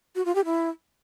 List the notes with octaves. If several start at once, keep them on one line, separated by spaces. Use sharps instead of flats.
F#4
F4
G4
E4